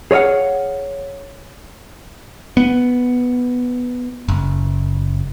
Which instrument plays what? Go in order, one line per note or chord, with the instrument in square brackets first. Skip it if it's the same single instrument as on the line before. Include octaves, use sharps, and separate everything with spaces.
[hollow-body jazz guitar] G#4 C#5 D#5 F5 F#5
[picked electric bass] B3
F#1